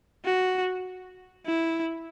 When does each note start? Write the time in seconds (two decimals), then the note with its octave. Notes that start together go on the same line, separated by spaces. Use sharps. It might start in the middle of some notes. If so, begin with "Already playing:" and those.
0.25 F#4
1.46 E4